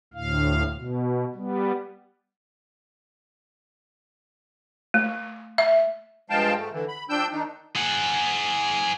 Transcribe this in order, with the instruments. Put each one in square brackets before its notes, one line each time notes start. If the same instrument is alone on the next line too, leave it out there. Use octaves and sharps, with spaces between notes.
[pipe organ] D2 A2 F5
B2
G3 B3
[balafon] A3
E5
[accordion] G2 F3 G#3 F5 G5 A5
G#2 A3
D3 E3
B5
F3 D4 G5 E6 G6
D#3 D4 D#4
[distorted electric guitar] G#4 F#5